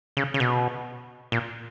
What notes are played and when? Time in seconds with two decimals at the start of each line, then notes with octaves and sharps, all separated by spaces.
0.17 C#3
0.34 C#3
0.40 B2
1.32 A#2